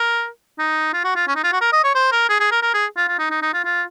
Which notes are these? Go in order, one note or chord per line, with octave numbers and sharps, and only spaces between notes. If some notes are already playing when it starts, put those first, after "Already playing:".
Already playing: A#4
D#4
F4
F#4
F4
C#4
D#4
F4
F#4
A#4
D#5
C#5
C5
A#4
G#4
G#4
A#4
A#4
G#4
F4
F4
D#4
D#4
D#4
F4
F4